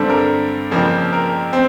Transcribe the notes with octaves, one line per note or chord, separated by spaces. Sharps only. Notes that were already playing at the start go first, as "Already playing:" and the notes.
Already playing: G2 D3 G3 C4 A4
A#4
F2 C#3 F3 A#3
A#4
C4